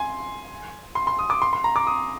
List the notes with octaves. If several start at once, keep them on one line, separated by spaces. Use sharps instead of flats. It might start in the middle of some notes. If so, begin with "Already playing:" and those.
Already playing: G#5 C6
C6
C6
D#6
D6
C6
C6
A#5
D6
D#6